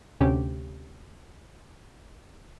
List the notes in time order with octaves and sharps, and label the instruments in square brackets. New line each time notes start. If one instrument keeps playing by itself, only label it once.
[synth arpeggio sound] D2 C3 C#4 G4